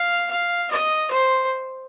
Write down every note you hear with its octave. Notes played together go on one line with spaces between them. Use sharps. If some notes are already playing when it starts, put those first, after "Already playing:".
Already playing: F5
F5
D#5
C5